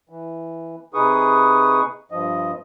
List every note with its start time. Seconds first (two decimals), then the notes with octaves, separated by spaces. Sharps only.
0.10 E3
0.94 C3 D#4 G#4 B4 C#6 D#6
2.11 G2 F3 D#5